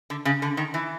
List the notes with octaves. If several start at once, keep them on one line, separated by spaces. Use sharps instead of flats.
D3
C#3
D3
D#3
E3